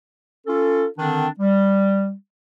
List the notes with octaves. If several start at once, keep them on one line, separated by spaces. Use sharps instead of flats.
C#4 F4 A4
D3 D#3 C4 D4
G3